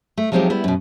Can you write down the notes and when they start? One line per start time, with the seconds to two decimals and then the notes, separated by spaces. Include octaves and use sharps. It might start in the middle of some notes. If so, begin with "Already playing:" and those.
0.18 A3
0.32 F3 F#3 G#3 C4 D#4 G4
0.50 G3 B3 E4
0.64 F#2 B2